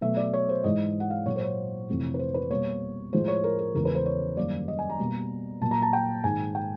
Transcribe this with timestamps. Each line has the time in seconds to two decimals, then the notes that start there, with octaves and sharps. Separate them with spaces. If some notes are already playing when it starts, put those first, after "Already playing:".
0.01 B2 F#3 A3 E5
0.17 D5
0.33 C#5
0.49 C5
0.64 G#2 E3 G#3 D#5
1.00 F#5
1.10 F5
1.26 A#2 F#3 A#3 C#5
1.36 C5
1.41 C#5
1.89 F2 C3 E3 A3
2.14 B4
2.19 C5
2.34 B4
2.51 B2 G3 A#3 C#5
3.13 A2 F3 G#3 C5
3.28 C#5
3.44 A#4
3.59 A#4
3.75 E2 C#3 E3 G#3 A#4
3.85 B4
3.95 C5
4.06 C#5
4.37 F#2 D#3 G3 A#3 D5
4.68 D#5
4.79 G#5
4.89 A#5
4.99 B2 G3 A#3
5.61 A#2 F#3 A#3 A5
5.71 A#5
5.82 A5
5.93 G5
6.24 G#2 D#3 G#3 G#5
6.55 G5